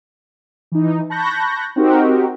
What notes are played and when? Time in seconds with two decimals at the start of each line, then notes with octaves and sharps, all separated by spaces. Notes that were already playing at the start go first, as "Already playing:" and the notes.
0.72 E3 D#4
1.10 A5 B5 C#6 F#6 G6 A#6
1.76 C4 D#4 F#4 G4 A#4